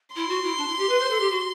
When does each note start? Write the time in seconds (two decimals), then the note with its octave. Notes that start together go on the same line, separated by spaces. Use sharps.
0.16 E4 C6
0.30 F#4
0.44 E4
0.58 D4
0.68 E4
0.79 G4
0.89 B4
1.00 C5
1.10 A4
1.20 G4
1.31 F#4